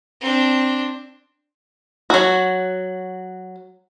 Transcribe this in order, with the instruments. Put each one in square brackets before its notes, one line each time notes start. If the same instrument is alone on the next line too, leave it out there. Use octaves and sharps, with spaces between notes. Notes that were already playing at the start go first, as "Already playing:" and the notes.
[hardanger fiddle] C4 D4
[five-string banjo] F#3 F#4